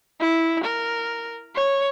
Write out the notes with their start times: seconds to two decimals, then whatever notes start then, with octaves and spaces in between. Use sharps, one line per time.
0.20 E4
0.64 A#4
1.55 C#5